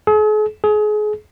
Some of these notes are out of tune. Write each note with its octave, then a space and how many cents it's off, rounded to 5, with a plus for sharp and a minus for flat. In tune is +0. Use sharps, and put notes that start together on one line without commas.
G#4 +45
G#4 +30